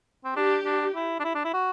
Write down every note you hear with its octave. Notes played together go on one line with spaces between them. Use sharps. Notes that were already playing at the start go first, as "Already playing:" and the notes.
C4
D4 G4
D4
E4
D4
E4
D4
E4
F#4